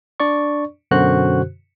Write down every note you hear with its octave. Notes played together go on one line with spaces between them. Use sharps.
D4 D5 C#6
F#2 B2 D3 F#4 C5 F#6